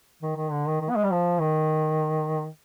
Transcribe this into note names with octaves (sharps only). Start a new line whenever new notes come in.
D#3
D#3
D3
D#3
D#3
B3
G#3
G3
F3
D#3